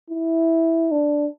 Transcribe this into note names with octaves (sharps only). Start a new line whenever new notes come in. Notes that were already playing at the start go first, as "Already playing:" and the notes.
E4
D4